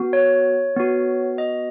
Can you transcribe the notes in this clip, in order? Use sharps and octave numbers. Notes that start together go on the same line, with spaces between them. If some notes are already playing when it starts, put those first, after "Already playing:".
Already playing: B3 F#4
C#5
B3 F#4
D#5